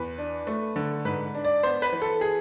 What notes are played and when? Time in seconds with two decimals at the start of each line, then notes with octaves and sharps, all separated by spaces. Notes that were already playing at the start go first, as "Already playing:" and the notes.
Already playing: E2 B4
0.18 D4
0.47 A3
0.76 D3
1.05 G#2 B4
1.34 D4
1.44 D5
1.63 B3 C5
1.82 B4
1.92 E3
2.02 A4
2.21 G#4